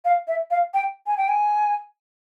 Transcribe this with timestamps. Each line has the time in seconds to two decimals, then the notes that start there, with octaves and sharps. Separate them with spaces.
0.05 F5
0.28 E5
0.51 F5
0.74 G5
1.07 G#5
1.17 G5
1.29 G#5